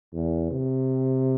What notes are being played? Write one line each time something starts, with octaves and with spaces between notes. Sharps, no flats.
E2
C3